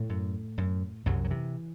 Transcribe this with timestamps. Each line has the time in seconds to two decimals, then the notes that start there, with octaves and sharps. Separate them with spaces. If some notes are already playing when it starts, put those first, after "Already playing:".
Already playing: A2 A3
0.09 F#2
0.58 F#2
1.06 C2 F#2 F#3
1.24 F#3
1.31 C3 E3